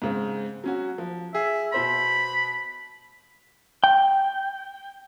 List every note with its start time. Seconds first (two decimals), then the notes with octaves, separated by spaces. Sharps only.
0.02 G#2 C#3 C4
0.64 F#3 C#4 F#4
0.98 F3
1.35 G#4 E5
1.73 B2 C5 B5 C6
3.84 G5